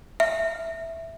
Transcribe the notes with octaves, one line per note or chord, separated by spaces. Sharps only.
E5